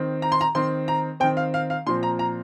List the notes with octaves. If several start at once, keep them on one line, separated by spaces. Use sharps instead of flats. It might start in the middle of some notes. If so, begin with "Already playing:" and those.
Already playing: D#3 C4
A#5
C6
A#5
D#3 C4 C6
A#5
D#3 C4 G5
F5
F5
F5
A#2 F3 C4 C6
A#5
A#5